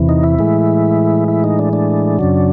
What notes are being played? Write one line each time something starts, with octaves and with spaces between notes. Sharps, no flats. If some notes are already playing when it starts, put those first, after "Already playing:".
Already playing: E2 C3 E3
D#4
E4
A2 E3 G#3
E4
D#4
D4
D4
F#2 C#3 F#3